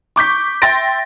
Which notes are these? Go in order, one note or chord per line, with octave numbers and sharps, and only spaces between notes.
C#6 D6 G6 B6
E5 G5 C6 A6 A#6 D7